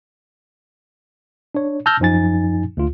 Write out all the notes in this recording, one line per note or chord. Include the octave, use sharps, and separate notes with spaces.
D4 C#5
A5 E6 F6 G6 A#6
F#2 F3 D#4 G#5 A6
D2 F4